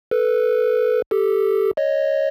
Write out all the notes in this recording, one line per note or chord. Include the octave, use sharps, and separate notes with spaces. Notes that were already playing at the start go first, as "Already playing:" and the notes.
A4 B4
G4 A4
C#5 D#5